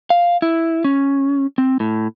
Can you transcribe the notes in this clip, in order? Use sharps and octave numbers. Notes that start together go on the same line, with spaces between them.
F5
E4
C#4
C4
A2